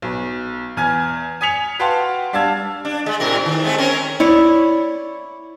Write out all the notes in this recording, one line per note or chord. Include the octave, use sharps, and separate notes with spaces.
B1
E2 G#5 F6 G#6
G#5 D#6 G#6 B6 C#7 F7
F#4 B4 F5 G5 A5 C6
G3 D4 F5 A5 E6 G#6
D4
G#3
A2 C3 A#4
D#3
G#3 A3 C4
C4 C#4 A#4
E4 C#5 D5 E5